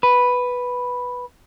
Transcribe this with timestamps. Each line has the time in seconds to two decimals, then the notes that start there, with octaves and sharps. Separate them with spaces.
0.03 B4